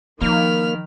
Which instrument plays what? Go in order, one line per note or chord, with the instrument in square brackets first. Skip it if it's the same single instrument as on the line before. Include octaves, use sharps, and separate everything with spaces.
[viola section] D#3 [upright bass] F3 [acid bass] A#3 [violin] B5 F6